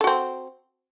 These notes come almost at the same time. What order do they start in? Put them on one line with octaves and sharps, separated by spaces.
A4 F#4 C4